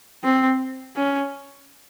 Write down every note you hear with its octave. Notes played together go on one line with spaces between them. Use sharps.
C4
C#4